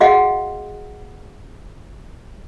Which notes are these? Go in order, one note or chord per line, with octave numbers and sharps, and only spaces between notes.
F#4 G#4 D#5 F5 F#5